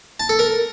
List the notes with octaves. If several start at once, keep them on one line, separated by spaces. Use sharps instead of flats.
A5
A4
A#4